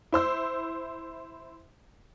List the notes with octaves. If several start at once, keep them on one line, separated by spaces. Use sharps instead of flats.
E4 C5 E6